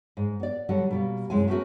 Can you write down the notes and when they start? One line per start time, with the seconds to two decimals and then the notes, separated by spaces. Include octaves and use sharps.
0.17 G#2
0.40 B3 D5
0.69 D3 F#3 G3 A4 F#5
0.91 B2 G3 A#3
1.30 F#2 C3 G#3 E4 G#5
1.47 A3 B3 C#4 D#4 F#4 A#4